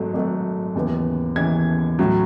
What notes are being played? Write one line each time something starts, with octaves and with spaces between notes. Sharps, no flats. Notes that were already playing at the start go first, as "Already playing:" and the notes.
Already playing: G#1 G#2 F#3 A3
G#1 G#2 F#3 A3
D#2 C#3 E3 B3
D#2 C#3 E3 B3 G#6
A2 F#3 C#4